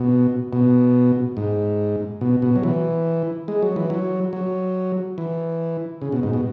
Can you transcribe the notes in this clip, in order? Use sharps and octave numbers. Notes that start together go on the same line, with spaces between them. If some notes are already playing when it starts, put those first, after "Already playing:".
Already playing: B2
B2
G#2
B2
B2
F#3
E3
G#3
F#3
E3
F#3
F#3
E3
C#3
B2
G#2
B2